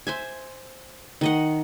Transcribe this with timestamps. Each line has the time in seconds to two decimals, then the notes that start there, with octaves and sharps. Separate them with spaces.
0.07 C5 E5 G#5
1.21 D#3 D#5 F#5